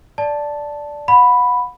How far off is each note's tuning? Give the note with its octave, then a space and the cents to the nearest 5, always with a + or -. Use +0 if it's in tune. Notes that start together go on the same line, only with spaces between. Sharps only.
D5 +0 A5 +0
F#5 -35 B5 +0